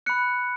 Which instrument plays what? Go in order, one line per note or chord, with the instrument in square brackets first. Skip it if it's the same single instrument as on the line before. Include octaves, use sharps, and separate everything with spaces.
[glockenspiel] B5 F#6 C#7